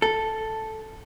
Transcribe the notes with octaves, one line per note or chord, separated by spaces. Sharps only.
A4